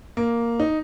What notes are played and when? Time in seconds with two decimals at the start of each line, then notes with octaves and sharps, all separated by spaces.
0.17 A#3
0.60 D#4